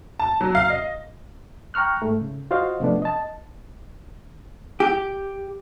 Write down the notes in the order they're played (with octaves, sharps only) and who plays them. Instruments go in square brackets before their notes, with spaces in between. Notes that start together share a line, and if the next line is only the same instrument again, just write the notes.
[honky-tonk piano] A5
F#3
F5
D#5
[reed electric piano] G5 A#5 C#6 F6 F#6
G#2 A3
C#3
F4 F#4 C5 D#5 F5
C3 F3 A3 B3 D4
D#5 A5
[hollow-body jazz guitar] G4